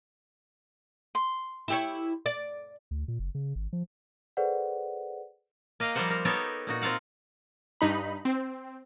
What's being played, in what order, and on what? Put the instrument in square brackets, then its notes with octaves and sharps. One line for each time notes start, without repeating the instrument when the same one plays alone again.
[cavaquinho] C6
[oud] E4 G4 C#5
D5
[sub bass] D2
A#2
F#1
C#3
G#1
F3
[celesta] G#4 A4 B4 C5 D5 F#5
[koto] A#3 D#5 F5 G5
F3 G3 A#3 A#4 C5 F#5
A#4
B3 D#4 G4 A4 A#4 C#5
A#2 D#4 F#4
C4 F4 A#4 F5 F#5
[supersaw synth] G2 D#4 B5
C4